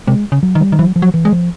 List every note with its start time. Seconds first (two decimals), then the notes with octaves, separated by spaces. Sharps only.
0.07 C3 G#3
0.32 C#3
0.43 F#3
0.55 D#3
0.60 G3
0.72 D#3
0.79 E3 F#3
0.96 F3
1.02 F#3
1.14 E3
1.25 G#3
1.32 F3